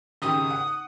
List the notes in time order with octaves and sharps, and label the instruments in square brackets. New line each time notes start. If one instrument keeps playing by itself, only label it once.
[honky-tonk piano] G#1 C#3 G4 [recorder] D#6
[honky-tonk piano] F#5